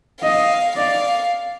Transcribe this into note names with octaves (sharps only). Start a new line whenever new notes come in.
D#5 F5
D5 F5